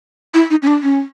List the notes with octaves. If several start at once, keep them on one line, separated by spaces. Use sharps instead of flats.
E4
D#4
C#4
D4
C#4